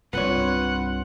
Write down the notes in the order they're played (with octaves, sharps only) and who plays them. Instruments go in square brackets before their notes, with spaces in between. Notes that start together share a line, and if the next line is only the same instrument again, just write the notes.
[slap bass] C2 G2 C4 [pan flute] F4 [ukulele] B4 C#5 [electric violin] F#5